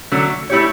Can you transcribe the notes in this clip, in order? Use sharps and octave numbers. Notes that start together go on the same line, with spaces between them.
D3 F#3 A3 C#4
A3 E4 G4 C#5